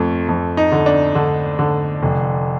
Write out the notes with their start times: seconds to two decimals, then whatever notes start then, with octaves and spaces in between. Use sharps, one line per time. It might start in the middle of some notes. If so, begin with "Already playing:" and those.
Already playing: F2 A3
0.28 F2
0.57 D#4
0.72 D3
0.86 D4
1.15 D3
1.59 D3
2.03 F1